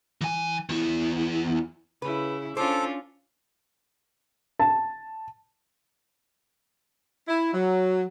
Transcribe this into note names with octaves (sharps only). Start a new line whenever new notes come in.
E3 G#5
E2 E4
C#3 E4 B4
C#4 D4 F4 A4 C5 D6
A5
E4
F#3